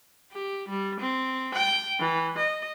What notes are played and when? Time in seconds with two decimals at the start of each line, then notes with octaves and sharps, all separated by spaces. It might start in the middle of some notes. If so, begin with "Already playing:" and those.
0.32 G4
0.69 G3
1.00 C4
1.54 G5
2.00 E3
2.38 D#5